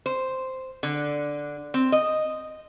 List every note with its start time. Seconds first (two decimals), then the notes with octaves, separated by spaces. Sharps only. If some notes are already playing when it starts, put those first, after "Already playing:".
0.06 C5
0.83 D3
1.74 C4
1.92 D#5